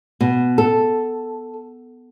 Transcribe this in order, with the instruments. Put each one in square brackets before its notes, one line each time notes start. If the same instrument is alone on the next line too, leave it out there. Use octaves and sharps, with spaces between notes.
[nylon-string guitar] B2
A4